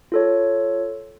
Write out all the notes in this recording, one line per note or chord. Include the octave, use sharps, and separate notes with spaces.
F4 A4 C#5